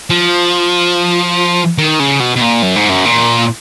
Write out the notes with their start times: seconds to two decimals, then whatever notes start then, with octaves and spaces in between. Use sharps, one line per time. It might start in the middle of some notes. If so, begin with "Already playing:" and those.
0.10 F3
1.78 D#3
2.00 C#3
2.20 B2
2.36 B2
2.41 A#2
2.62 F#2
2.76 G#2
2.89 F#2
3.05 A#2